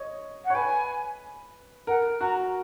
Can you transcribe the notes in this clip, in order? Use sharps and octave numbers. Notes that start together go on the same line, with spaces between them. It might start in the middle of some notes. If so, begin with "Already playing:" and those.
Already playing: C#5 D#5
F#5
C#5
B4 G#5
A#4 F#5
F#4 A#5